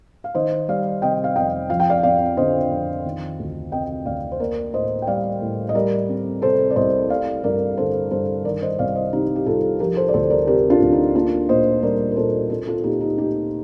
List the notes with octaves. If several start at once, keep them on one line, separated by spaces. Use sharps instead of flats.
F5
D#3 C5 D#5
G3 D5 F5
C3 D#5 G5
F5
F2 D#5 G5
F3 F5
G5
D5 F5
F2 D5 F5
D3 C5 D#5
F2
D#3
D2
C3 D#5 G5
D2 D5 F5
C5
A#3 A#4 D5
A2 C5 D#5
G5
G3 D5 F5
A2
D#5
G3 A#4 D5
C4
C3 A4 C5
D5
C2 C5 D#5
A3 D5 F5
G2 A#4 D5
D3 A4 C5
G2 A4 C5
D#3 A#4 D5
C5 D#5
C2 D5 F5
C5 D#5
C3 D#4 G4
G4
C2 F4 A4
F3 G4 A#4
A4 C5
D5
D2 A4 C5
A#4 D5
C3 G4 A#4
D4 F4
D2
D#4
A#3 D4 F4
A#2 C5 D#5
G3 A#4 D5
A#4
A#2 A4 C5
C4 F4 A4
F4 A4
A#2 D#4 G4
D#4 G4
A3 D#4 G4